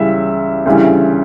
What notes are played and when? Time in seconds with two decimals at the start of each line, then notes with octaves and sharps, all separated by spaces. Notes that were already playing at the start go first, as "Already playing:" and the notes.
Already playing: C#2 C#3 E3 G3 E5
0.66 D2 C#3 E3 G3